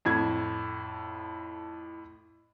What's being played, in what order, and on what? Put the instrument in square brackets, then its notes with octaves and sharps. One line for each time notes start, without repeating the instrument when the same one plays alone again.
[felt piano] F2 A2 G#6